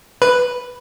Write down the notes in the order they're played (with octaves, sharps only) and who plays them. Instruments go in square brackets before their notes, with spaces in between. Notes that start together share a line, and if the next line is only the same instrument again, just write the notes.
[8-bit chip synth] B4